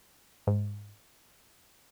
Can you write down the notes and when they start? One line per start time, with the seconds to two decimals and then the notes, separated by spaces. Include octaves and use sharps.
0.47 G#2